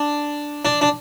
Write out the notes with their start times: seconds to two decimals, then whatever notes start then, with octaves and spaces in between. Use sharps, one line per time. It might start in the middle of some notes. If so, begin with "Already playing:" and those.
Already playing: D4
0.65 D4
0.81 D4